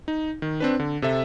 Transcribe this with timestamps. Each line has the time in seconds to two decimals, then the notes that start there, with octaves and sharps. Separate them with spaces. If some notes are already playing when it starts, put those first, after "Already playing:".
0.08 D#4
0.42 D#3
0.60 C4 D4 B4
0.80 D3
1.02 C3 A4 E5